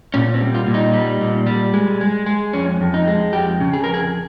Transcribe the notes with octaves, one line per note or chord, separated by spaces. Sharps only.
A#2 C#4
C4
G3
F4
A#2
D#4
G3
A#2
G3
G#3
G#3
G#3
F2 C#4
F2
D#4
G#3
F2 G4
C#3
G#4
F2 A#4
G#4